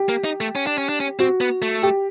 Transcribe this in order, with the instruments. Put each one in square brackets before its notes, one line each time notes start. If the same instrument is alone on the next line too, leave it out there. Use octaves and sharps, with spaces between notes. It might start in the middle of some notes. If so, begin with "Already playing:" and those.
Already playing: [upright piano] G4
[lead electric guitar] A#3
D#4
A3
C#4
D4
C#4
D4
C#4
[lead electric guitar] C4 [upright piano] F#4
[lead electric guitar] B3
A3
[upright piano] G4